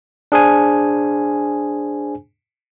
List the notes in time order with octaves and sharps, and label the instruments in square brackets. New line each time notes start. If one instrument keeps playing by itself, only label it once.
[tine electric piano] D4 G#4 C5 G#5